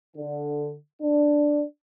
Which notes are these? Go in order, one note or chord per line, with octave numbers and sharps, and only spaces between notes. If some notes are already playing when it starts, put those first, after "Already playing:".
D3
D4